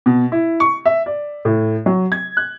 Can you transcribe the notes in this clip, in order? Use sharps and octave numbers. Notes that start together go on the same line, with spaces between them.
B2
E4
C#6
E5
D5
A2
F#3
G#6
F#6